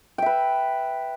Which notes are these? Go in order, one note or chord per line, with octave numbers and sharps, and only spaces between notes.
B4 E5 G5